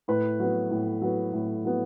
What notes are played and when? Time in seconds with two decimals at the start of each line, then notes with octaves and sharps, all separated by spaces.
0.08 A2 B4
0.39 F#3 B3
0.71 A2
1.01 F#3 B3
1.33 A2
1.64 F#3 B3